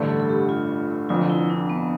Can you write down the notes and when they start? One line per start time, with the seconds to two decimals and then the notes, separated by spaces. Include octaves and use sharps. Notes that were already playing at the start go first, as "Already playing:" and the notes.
Already playing: A1 G2 D3 A3
0.09 A4
0.20 A4
0.29 G4
0.49 F4
1.09 F1 F2 D3 F4
1.30 E4
1.50 D4
1.69 B3